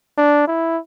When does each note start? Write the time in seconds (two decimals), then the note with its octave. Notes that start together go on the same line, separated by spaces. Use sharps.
0.17 D4
0.47 E4